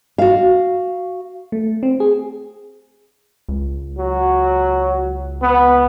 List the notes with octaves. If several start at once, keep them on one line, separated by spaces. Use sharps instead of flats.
F#4 F5
A3
C4
G#4
C#2
F#3
B3